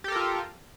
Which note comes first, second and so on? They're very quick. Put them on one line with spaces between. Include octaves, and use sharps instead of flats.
G4 A4 A#4 F4